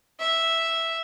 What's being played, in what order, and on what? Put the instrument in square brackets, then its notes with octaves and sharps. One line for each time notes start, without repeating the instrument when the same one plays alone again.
[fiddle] E5